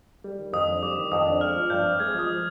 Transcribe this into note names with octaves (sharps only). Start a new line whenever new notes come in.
G3
D#3
F2 D#6
D4
G3 D6
D#3
F2 D#6
D4
G#3 F6
F3
G2 G6
C4
G#3 G#6
F3 D#6